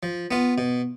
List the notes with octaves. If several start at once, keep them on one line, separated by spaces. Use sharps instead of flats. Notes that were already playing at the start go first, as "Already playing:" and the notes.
F3
B3 F4
B2